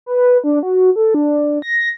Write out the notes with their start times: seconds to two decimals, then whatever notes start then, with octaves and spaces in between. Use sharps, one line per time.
0.06 B4
0.44 D4
0.63 F#4
0.96 A4
1.14 D4
1.62 A#6